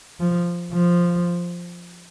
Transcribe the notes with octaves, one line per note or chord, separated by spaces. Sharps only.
F3
F3